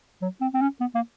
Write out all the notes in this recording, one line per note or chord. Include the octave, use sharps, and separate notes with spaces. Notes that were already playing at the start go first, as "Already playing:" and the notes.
F#3
C4
C4
C#4
B3
A#3